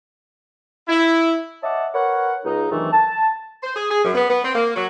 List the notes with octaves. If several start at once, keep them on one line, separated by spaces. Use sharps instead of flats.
E4
C#5 D#5 E5 F#5 A5 D6
A#4 B4 C#5 F#5
C#2 D#4
G2 C3 D#3 E3 F#3 A3
A5
C5
G#4
G#4
F#2
B3
B3
C4
A#3
F#3